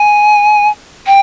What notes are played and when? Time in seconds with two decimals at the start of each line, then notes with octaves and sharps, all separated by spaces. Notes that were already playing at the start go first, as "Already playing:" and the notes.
Already playing: G#5
1.06 G5